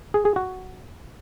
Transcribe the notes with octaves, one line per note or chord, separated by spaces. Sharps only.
G#4
G#4
F#4